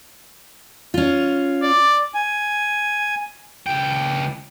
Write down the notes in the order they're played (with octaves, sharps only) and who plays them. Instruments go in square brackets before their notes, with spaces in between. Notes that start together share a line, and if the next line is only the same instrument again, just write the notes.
[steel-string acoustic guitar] C#4 F4
[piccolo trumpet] D5
[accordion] G#5
[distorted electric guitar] C#2 G5